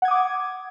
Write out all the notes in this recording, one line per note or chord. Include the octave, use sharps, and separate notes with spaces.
F#5 D6 D#6 G#6